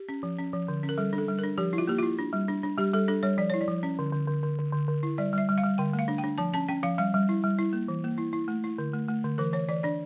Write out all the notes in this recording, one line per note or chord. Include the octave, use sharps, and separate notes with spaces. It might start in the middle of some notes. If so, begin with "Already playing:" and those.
Already playing: G4
C#4
F3
C#4
F3
D3
C#4
A#4
G3 A4
D4
A4
G3
D4 A#4
F3 G4
E4
F4
A#3 G4
E4 F4
D4
G3
D4
D4
G3 G4
G3 A4
D4 A4
G3 C#5
F3 D5
E4 C#5
D5
F3
C#4
D3
D3
D3
D3
D3
D3
D3
E4
G3 D5
G3 E5
G3
F5
G3
D3 G5
A3
F5
D4
G5
D4
F3 A5
C#4 A5
C#4 G5
F3 F5
G3 F5
G3
E4
G3
E4
A#3
E3
A#3
E4
E4
A3
E4
D3
A3
A3
D3
E3 A#4
E3 C#5
E3 D5
D4 D5